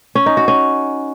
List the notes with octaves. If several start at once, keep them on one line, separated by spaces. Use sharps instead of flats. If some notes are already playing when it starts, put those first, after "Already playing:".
C#4
D#4
F#4
C#4